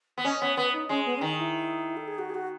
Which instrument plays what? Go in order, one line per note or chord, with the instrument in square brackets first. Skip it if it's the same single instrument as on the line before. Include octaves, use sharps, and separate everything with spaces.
[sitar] B3
[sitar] C#4 [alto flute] D#5
[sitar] B3 [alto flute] C#5
[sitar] B3 [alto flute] B4
[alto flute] D#4
[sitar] G#3 [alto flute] C#4
[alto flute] B3
C#4
[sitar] D#3 [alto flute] D#4
[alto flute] E4
A4
G#4
F#4
G#4
F#4